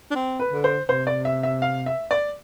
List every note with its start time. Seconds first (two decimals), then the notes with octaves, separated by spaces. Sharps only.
0.11 D4
0.15 C4
0.39 B4
0.52 D3
0.64 C5
0.89 C3 C5
1.07 D5
1.25 E5
1.43 E5
1.62 F5
1.86 E5
2.11 D5